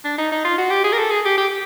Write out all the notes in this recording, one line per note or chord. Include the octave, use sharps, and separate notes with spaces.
D4
D#4
D#4
F4
F#4
G4
G#4
A#4
A4
G#4
G4
G4